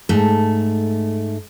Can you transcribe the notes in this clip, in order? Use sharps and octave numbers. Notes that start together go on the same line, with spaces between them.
G#2 A3